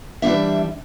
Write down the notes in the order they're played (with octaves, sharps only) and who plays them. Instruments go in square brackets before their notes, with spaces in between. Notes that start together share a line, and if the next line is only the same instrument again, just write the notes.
[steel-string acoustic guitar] E3 G3 D4 E5